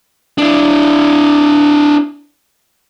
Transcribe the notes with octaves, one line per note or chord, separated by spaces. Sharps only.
D4 E4